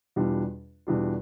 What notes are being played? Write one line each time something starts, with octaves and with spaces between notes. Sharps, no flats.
E2 B2 G3 D4 F4
E2 B2 G3 D4 F4